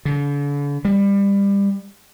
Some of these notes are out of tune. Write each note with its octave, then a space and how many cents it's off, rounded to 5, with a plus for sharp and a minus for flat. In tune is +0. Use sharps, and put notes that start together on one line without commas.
D3 -40
G3 +25